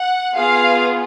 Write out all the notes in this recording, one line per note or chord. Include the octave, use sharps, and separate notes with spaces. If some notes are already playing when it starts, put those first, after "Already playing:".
Already playing: F#5
B3 F4 G#4 F5